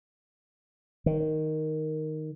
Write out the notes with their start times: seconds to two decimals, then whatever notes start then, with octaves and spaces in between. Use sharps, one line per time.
1.06 D#3